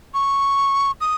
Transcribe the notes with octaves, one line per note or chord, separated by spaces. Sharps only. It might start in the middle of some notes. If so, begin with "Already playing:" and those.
C#6
D#6